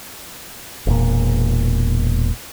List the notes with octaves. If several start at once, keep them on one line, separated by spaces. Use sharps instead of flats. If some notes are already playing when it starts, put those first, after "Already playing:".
E1 A#2